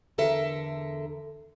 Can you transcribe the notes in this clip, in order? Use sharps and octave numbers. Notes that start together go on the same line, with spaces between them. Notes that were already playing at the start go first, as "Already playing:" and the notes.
E2 D3 A4 A#4 E5